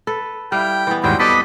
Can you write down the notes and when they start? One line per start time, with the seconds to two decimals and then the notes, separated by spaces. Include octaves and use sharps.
0.07 A4 B4
0.52 G3 E4 F5 G5
0.87 E3 B3
1.03 D#2 G#2 F#3 G3 C4 F#5 G5
1.20 B3 D4 G4 A4 D5 D#5 B5 D6